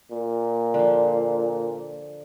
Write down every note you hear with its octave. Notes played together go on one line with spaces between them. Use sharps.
A#2
D3 F3